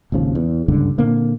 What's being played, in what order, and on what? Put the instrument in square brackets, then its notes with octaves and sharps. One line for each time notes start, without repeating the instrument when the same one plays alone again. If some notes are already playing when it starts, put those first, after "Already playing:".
[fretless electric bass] G#1 D#2 C#3 F3
E2
F#1 C#2 G2 D3
A#2 D3 A#3 C4